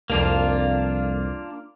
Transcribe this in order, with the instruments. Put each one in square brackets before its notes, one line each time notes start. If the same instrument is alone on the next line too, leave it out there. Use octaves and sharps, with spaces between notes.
[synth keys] C2 F2 [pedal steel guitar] A#3 D4 F4